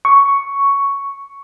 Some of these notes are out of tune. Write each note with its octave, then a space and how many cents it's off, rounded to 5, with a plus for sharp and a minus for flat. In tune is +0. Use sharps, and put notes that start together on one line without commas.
C#6 +5